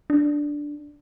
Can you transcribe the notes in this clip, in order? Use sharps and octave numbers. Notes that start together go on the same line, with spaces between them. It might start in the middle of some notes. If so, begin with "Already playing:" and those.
D4